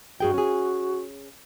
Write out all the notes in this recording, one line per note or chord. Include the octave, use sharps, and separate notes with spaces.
G2 F#4 G#4 G5
C#4 G#4